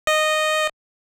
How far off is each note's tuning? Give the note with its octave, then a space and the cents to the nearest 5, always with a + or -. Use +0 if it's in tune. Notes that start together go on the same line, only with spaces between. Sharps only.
D#5 -10